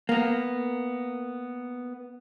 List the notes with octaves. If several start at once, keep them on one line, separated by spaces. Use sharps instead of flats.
A#3 B3